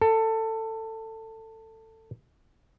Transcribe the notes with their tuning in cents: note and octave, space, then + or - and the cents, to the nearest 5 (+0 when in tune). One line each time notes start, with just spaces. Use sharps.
A4 +20